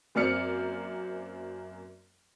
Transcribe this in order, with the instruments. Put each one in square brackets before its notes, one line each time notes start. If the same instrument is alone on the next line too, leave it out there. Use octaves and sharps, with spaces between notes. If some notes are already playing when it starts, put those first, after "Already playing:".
[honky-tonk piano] F#2 A#3 C4 D5 F6 C#7